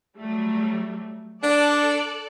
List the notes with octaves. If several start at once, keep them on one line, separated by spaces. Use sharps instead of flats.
F#3 G3 A3
D4 A4 D5 F#6